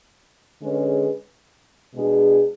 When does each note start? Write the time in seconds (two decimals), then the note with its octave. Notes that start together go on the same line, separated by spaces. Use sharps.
0.62 D3 G#3 C#4 G#4 B4
1.95 B2 G#3 D4 G#4